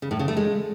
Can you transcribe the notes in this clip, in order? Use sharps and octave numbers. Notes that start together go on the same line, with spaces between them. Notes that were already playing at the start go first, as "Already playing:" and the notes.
C#3
A2
C#3
A3
G#3